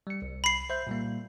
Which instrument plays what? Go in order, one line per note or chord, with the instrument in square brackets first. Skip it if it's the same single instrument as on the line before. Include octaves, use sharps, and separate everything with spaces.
[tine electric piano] G3 C#7
C2
[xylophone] B5 C7
[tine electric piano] C5 E5 G6
A#2 G3 A#3